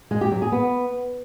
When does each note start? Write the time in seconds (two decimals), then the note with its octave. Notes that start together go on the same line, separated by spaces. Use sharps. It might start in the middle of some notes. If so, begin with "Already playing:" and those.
0.11 G#3
0.21 G4
0.32 F#3
0.42 G#4
0.52 B3